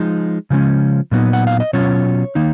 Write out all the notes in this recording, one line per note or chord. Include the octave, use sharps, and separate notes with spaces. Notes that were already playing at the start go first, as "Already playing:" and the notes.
Already playing: F3 G#3 D#4
C#3 F3 G#3 C#4
A#2 F#3 B3 D#4
F#5
F5
D#5
B2 F#3 C#4 F4 C#5
D#3 A#3 D#4